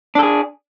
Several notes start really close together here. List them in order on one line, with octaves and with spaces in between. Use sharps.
D4 A4 G#4